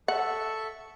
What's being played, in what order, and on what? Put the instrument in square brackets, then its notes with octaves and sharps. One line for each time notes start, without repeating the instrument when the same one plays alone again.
[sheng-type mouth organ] A4 E5 C#6 [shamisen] F#5